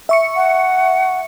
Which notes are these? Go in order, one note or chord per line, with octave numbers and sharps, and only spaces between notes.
E5 C#6 C#7
F#5